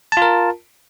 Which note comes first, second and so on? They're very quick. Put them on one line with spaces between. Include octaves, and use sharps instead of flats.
A5 F4 A#4